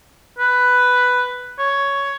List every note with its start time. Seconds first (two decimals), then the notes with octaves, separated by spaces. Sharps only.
0.39 B4
1.59 C#5